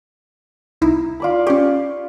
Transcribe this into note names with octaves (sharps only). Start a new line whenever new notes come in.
C2 D#4 E4
F4 D5 B5
C#4 G4 C#6